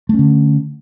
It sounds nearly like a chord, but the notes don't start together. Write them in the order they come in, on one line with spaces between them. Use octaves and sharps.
A3 C#4 D3